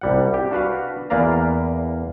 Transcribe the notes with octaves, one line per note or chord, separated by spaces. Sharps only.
C2 G3 F#5
G4
D4 F#4 B4 F5
E2 A#3 B4 D5 F5 A#5